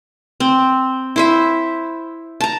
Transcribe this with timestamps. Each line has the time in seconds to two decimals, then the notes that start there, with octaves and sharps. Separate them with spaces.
0.40 C4
1.16 E4 C5 E5
2.41 A5 A#5